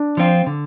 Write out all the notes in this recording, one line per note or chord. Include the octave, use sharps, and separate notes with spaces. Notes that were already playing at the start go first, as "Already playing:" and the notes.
Already playing: D4
F3 C4 F4
D3